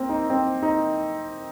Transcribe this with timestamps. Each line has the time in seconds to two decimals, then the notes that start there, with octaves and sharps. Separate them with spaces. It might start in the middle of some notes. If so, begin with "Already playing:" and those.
Already playing: A#3 C4
0.09 D#4
0.30 C4
0.63 D#4